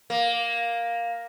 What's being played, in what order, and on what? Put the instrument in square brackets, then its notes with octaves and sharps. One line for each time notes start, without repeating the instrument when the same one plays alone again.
[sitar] A#3